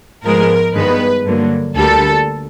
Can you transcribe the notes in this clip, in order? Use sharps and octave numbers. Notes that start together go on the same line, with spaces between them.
G#2 F3 G#3 B3 A#4
G2 D#3 G#3 B3 B4
G2 D3 F#3 A#3
D2 D3 G3 A#3 A4